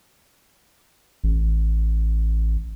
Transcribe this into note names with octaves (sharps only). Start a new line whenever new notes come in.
A1